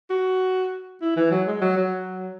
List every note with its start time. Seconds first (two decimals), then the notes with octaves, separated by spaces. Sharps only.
0.10 F#4
1.02 E4
1.16 E3
1.31 F#3
1.47 G#3
1.62 F#3
1.77 F#3